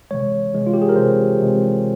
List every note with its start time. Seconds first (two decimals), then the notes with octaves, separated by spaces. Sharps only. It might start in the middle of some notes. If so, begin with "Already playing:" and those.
0.11 C3 E3 G#3 C#5
0.53 C3 E3 G#3
0.67 F4
0.74 G4
0.82 G#4
0.89 A#4
0.96 C3 E3 G#3 C5
1.39 C3 E3 G#3